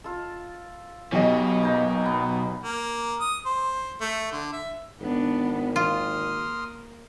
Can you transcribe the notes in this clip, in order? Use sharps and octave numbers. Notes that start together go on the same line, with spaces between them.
F4 A4
B1 B2 G4 D#5
A#3 D#4
B3
A#3
D#6
C5
A3
D3
E5
G#1 B3 D4
A#3 F4 C6 D#6 F6